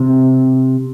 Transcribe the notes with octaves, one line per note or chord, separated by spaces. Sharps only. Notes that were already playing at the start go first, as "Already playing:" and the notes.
Already playing: C3